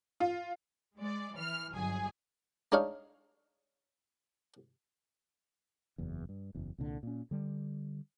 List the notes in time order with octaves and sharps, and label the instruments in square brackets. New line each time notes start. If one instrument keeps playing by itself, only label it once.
[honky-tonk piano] F4
[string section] G#3 D5
E3 F6
G1 F#3 G#4 G#5
[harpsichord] G#3 D4 D#4 C#5 F5
[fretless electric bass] F#1 E2
G2
F#1 E2
C2 A#2 D3
A#2 C#4
D3 G3